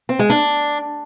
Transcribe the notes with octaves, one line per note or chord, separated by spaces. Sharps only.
C4
G#3
D4